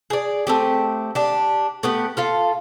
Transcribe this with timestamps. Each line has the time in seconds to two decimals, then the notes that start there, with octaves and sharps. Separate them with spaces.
0.10 G#4 D5
0.47 A3 C4 G4
1.15 D4 G4
1.83 A3 B3 G4
2.17 F4 A4 F5